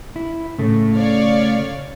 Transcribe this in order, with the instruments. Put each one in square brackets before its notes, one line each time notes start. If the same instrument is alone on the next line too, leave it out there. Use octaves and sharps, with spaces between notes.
[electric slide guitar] E4
[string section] A2 [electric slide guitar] C#3 A3
[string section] C#5 D5 F5